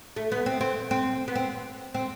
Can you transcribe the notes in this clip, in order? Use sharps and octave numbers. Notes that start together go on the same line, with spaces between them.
A3
B3
C4
C4
C4
B3
C4
C4